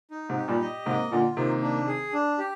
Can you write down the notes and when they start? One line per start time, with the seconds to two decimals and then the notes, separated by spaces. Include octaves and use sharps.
0.11 D#4
0.30 G#2 C3
0.36 G4
0.48 G2 A#2
0.61 D#5
0.86 G#2 C3 A#3
1.11 A#2 D3 F4
1.37 C3 D#3 A#3
1.62 D4
1.87 G#4
2.13 D4
2.38 G4